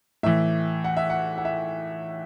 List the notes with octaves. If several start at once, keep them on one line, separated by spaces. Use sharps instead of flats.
A2 E3 E5
F#5
E5
F#5
F#5
E5